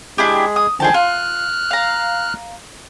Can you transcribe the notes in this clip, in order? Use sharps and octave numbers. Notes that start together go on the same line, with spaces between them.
G#3 D4 E4 G4 G#4
D#6
D3 D#3 F3 G#4 G5 A5
F4 F6 F#6
F5 A#5